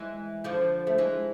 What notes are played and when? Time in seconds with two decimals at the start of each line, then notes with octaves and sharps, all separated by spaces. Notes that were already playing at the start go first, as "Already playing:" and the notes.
Already playing: E3 G#3
0.44 D3 F3
0.87 A3
0.98 E3 G#3